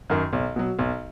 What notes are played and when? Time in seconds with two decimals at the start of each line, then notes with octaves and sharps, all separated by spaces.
0.10 F#2 D#3
0.33 B1
0.56 B2 F#3
0.79 B1